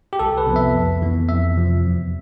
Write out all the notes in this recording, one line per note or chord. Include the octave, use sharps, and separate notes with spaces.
G4
C2 A4
B4
C3 F3 B3
E5
F2
E3 B3
F2 E5
C3 F3
E2